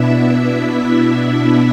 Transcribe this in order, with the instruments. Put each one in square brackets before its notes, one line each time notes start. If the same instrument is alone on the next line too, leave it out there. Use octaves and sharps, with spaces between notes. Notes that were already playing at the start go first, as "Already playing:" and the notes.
Already playing: [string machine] B2 B3 D4 E4 E5